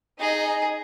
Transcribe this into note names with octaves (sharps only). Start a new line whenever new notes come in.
D#4 G#4 D#5